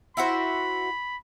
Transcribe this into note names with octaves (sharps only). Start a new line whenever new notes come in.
E4 F#4 C5 B5